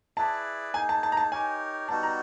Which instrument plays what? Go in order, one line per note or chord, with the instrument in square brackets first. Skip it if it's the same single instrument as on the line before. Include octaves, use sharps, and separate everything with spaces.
[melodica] E4 G#4 B4 D5 [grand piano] A5
[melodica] A#3 D#4 G#4 [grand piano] G#5
[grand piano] A5
A5
A#5
A5
[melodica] D#4 G4 A#4 C#5 [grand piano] G#5
[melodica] G3 B3 D#4 F#4 [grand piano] A5
[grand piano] A#5